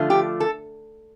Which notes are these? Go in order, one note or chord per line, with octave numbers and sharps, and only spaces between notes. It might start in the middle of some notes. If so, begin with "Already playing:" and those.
Already playing: D3 F3 A3 F4
G4
A4